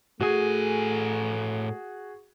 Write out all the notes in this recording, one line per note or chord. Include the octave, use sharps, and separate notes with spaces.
A2 A3 F#4 G#4 G#5